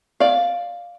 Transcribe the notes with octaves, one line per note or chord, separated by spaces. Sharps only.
D5 F5